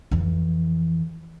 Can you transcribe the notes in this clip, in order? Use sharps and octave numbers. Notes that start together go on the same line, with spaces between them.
F2 E3